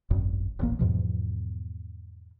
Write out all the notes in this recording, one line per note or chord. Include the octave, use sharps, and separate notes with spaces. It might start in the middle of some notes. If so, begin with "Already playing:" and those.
D#1 G#1 F#2
D#1 A1 A#3
E2 G#2 B2 F3